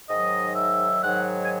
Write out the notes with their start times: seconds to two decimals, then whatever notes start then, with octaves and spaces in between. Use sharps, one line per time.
0.08 G#2 D#3 F#3 D#5
0.55 E5
1.02 G#2 D#3 F#3 F#5
1.44 G#5